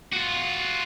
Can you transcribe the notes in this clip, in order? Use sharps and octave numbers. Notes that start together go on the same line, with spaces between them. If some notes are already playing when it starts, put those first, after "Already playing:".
F4 F#4